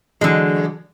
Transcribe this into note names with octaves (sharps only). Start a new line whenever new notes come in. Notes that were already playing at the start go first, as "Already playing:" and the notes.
D3 E3 F#3 G#3